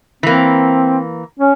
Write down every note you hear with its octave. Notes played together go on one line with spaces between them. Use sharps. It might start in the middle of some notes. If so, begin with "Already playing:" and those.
E3 A#3 C4
C#4